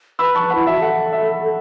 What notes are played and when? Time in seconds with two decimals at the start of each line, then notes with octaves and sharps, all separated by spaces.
0.19 B4 B5 E6
0.35 A5 C#6
0.50 E4 F#5 B5
0.66 F#4 E5 A5
0.81 A4 F#5
1.13 E5
1.45 A4